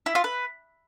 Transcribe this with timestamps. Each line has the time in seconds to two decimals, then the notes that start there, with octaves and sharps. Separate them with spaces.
0.06 E4
0.15 F4
0.24 B4